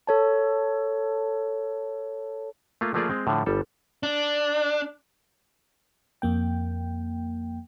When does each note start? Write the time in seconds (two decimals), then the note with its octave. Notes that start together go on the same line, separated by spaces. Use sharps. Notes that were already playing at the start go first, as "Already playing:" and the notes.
0.07 A4 C#5 A5
2.81 A3 A#3 F4
2.94 F3 A3 A#3 F4 G#4 D5
3.09 G#3 C4
3.27 A2 D3 F3
3.46 G1 G3 A4
4.03 D4
6.22 F2 A#3 G5